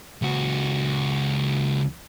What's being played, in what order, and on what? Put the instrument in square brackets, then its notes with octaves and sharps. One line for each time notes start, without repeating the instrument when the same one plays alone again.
[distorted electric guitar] C#2 F#4